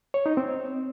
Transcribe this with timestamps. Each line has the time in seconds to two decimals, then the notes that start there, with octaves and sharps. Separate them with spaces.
0.14 C#5
0.26 D#4
0.37 C4